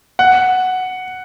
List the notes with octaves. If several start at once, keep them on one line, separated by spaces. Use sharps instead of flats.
F#5